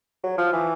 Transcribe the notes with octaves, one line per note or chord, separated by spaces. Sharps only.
F#3
F3
E3